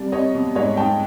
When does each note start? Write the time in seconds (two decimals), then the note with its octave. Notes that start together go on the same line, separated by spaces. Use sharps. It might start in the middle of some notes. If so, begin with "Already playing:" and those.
Already playing: C2 G3 D5
0.12 C2 C#5 D#5
0.35 B2
0.55 G#2 C#5 D#5
0.77 G#2 G5 A5